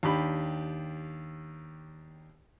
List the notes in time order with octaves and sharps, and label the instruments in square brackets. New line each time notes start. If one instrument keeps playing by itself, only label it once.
[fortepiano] D#2 D4 G4 B5